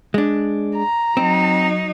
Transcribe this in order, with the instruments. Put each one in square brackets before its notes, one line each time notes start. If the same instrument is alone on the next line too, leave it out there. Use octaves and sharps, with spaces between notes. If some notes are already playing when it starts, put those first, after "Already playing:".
[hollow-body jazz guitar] G#3 D4
[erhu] A#5
[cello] F#3 D#4 [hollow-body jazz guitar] C4